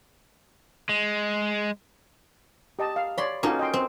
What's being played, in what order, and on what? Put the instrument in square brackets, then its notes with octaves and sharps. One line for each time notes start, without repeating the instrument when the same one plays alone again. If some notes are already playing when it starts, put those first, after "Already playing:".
[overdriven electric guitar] G#3
[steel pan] G4 D#5 A5
F5
[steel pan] C#5 D5 [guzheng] B5 C6
[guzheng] A#3 C#4 D#4 [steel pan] F4 F#4 A4
[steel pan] D#5 G5 C6
[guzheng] C4